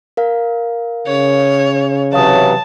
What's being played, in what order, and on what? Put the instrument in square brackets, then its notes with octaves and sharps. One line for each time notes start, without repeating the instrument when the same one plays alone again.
[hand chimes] A#4 F5
[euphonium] C#3 [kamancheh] C#5
[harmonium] C3 E3 F#3 [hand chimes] C#5 F5 D#6 [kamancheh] A5